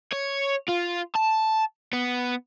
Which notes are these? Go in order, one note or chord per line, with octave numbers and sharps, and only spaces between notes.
C#5
F4
A5
B3